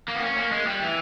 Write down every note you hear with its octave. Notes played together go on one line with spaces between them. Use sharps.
A#3
B3
C#4
A#3
G#3
G3
E3